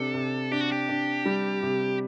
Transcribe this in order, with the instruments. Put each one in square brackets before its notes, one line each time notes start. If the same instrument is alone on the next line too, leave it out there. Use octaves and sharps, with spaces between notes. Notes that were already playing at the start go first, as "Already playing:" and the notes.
Already playing: [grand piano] C3 D4 [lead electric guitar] A4
[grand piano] C3
[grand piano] D4 [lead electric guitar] G4
[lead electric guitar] F#4
G4
[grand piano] D4
G3
C3